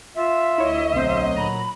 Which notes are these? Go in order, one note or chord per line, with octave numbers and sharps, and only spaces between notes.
F4 E5
D2 E4 C#5 D#5
B1 F#3 C4 C5
A#2 A#5 B5